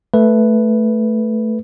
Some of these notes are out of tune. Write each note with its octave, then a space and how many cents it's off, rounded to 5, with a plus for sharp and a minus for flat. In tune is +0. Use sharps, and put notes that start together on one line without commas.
A3 +0 B4 -5